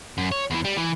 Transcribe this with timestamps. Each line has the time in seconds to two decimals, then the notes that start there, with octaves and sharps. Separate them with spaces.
0.18 F#2
0.32 C#5
0.51 E2 E3
0.65 G3
0.77 E3